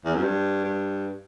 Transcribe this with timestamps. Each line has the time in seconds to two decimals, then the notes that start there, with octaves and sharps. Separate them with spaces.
0.05 E2
0.15 F#2
0.23 G2
0.64 G2